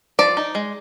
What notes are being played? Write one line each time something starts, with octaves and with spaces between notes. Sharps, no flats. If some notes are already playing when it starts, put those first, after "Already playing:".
F3 D5
D#4
G#3